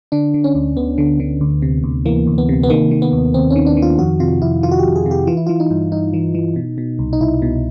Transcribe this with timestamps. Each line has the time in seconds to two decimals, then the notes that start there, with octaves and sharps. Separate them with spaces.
0.12 D3 D4
0.34 D3
0.44 C#4
0.55 D2
0.77 D2 B3
0.98 D3
1.20 D3
1.41 D2
1.62 C3
1.84 D2
2.05 E3 A#3
2.27 D2
2.38 B3
2.49 C3
2.63 B3
2.70 D#3 A#3
2.91 D#3
3.02 B3
3.13 D#2
3.34 D#2 C4
3.50 C#4
3.56 D#3
3.67 D4
3.77 D#3
3.82 F4
3.99 F2 F#4
4.20 C3 F4
4.42 F2 E4
4.63 D#3 F4
4.71 F#4
4.79 G4
4.84 F2
4.96 G#4
5.06 C3
5.11 G4
5.27 E3 F4
5.37 E4
5.47 E3 F4
5.60 D#4
5.70 G2
5.92 G2 D#4
6.14 E3
6.35 E3
6.56 B2
6.78 B2
6.99 C2
7.13 D#4
7.21 C2 E4
7.42 B2